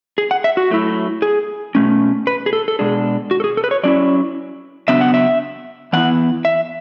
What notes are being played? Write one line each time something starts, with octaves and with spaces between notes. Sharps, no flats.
G#4
F#5
E5
F#4
F#3 A3 E4
G#4
B2 A3 C#4
B4
G#4
A4
A4
B2 G#3 D4 G#4
F#4
A4
G#4
A4
B4
C#5
F#3 C#4 E4 D5
C#3 F#3 B3 D4 E5
F#5
E5
E3 B3 E4 F#5
E5